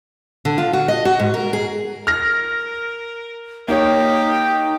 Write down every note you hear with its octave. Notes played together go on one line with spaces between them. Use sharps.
D3
F4
F#4
D#5
F#4
G#2
A#4
G#4
A#4 F6 A#6
A#3 D#4 G4 C#5